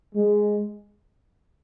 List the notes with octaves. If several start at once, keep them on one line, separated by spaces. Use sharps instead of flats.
G#3